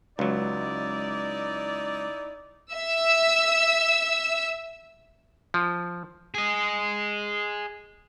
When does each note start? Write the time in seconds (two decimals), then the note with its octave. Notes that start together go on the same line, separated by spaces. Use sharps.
0.19 C#2 F#3 D#4 E4 D5
2.72 E5 E6
5.54 F3
6.34 G#4 D#5